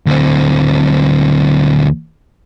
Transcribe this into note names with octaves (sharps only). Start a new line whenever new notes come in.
D2 C4